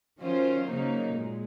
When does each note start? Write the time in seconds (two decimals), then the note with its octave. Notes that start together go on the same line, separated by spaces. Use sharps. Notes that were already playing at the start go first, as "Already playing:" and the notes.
0.19 D#3 F#3 C#4 F4 C5
0.66 C#3 F#3 A#3 D#4
1.14 A#2 G#3